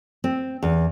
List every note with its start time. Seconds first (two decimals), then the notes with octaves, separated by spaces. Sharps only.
0.24 C4
0.63 E2